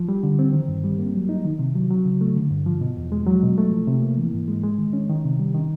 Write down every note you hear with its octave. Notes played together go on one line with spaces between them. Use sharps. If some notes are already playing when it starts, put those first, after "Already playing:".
Already playing: F3
G3
D3
C4
D#3
G2
G3
A#3
F#3
D#4
D#3
C3
F#3
F#3
C#3
A3
D3
G2
F3
B2
E2
G#3
F#3
B2
A3
F3
C3
A#3
E3
G#2
G#3
G#3
D#3
C#4
D#3
C3
G3
D#3